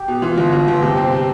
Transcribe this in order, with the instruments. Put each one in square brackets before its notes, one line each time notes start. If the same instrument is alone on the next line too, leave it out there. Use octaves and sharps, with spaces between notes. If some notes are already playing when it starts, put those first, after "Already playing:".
Already playing: [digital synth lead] G4
[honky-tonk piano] B2
[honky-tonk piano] E3 [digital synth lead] F4
[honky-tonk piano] G1
G1
G1
[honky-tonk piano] C3 [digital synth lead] G4
[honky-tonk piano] C4
[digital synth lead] G4
[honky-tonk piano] C3